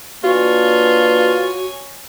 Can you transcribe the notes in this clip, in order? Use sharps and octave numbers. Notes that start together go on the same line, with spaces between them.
A#3 D4 F4 F#4 B4 C#5 G#5